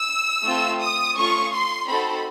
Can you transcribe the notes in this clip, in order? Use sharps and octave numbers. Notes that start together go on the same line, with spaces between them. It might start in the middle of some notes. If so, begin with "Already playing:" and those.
Already playing: E6
A3 C4 F4 A4
D#6
A3 C#4 F4 C#6
C6
C4 D#4 F#4 A4 B5